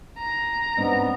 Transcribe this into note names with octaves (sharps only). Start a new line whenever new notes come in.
A#5
G#2 B3 C4 D4